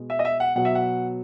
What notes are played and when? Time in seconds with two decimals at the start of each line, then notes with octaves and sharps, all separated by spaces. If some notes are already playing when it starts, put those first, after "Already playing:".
Already playing: B2 G#3
0.10 E5
0.19 D#5
0.25 E5
0.40 F#5
0.56 B2 F#3 F#5
0.65 E5
0.75 F#5